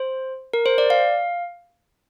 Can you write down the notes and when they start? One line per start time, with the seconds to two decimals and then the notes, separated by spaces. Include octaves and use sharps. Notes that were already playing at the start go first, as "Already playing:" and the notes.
Already playing: C5
0.53 A#4
0.66 C5
0.78 D5
0.90 F5